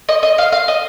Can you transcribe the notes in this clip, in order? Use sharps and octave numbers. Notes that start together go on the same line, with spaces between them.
D#5
D#5
F5
F5
D#5